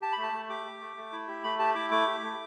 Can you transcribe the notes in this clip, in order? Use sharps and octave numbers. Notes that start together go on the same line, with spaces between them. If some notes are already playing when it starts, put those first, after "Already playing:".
G4 A5
B5
A3
A5
A3
G4 D6
G4
A3
A3
E4
G4
A3 B5
G4 A5
E4 D6
A3 D6
G4
A3